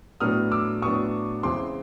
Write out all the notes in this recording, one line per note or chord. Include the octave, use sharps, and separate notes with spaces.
A2 F#3 B3 D4 D#6 F6
D6 E6
A2 F#3 B3 D4 C#6 D#6
E2 C#3 E3 G#3 C4 C6 D6